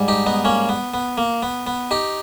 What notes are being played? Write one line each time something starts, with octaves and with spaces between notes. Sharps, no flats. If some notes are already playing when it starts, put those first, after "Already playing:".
Already playing: G#2 G3
D#4 G4
B3 D#4
A#3 C#4
B3
B3
A#3
B3
B3
D#4 G4